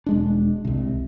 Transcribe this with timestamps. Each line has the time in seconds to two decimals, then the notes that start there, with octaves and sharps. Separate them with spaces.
0.06 E1 G#3 D4
0.65 C2 C3